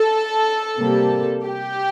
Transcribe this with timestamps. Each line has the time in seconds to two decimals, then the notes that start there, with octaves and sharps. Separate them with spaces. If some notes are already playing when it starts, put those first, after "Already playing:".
Already playing: A4
0.78 C3 G3 A#3
1.46 G4